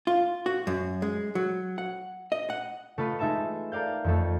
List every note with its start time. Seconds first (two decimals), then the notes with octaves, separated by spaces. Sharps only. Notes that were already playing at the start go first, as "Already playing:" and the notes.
0.07 F4
0.46 F#4
0.67 F#2
1.02 G#3
1.35 F#3
1.78 F#5
2.32 D#5
2.50 F#5
2.98 A3 F4 B4 D#5
3.19 G#3 D#4 E5 A5 E7
3.72 A4 A#4 D5 F5 G6
4.04 F2 F3 A3